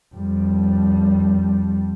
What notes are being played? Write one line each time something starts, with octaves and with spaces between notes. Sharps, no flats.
F2 G3